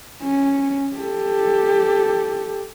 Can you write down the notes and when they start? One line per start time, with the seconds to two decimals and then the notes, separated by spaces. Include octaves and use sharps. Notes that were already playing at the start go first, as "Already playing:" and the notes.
0.23 C#4
0.96 G4 A4